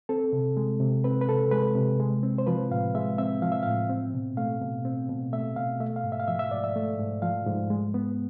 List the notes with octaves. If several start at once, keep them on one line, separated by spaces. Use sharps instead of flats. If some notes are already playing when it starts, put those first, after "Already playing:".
C4 A4
C3
G#3
C3
C4 B4
B4
C3 A4
G#3 B4
C3
G#3
C4
C5
F3 B4
A2 F5
G#3 E5
C4 E5
F3 F5
E5
A2 F5
C4
B2
A3 F5
B2
C4
B2
A3 E5
B2 F5
A3 E5
F5
G#2
E5
F5
F3 E5
E5
G#2 D5
E5
A3
G#2
F3 F5
G#2
G#3
B3